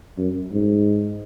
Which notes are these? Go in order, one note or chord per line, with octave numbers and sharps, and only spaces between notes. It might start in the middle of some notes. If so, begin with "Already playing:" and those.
F#2
G#2